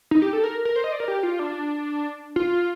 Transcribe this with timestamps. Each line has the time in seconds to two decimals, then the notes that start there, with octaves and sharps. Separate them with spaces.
0.11 D#4
0.22 G4
0.33 A4
0.44 A#4
0.65 A#4
0.76 C5
0.84 D#5
0.92 D5
1.00 A#4
1.08 G4
1.23 F4
1.39 D4
2.36 F4